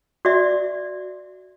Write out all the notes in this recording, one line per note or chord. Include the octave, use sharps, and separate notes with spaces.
F#4 D5 E5